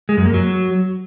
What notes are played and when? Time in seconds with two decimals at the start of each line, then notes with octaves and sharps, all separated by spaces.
0.09 G#3
0.17 F#2
0.26 A#3
0.34 F#3